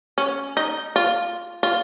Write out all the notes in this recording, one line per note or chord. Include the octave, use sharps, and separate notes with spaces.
C#4
D#4
F4
F4